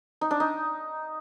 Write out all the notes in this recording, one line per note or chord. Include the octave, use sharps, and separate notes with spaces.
D#4
D4
D#4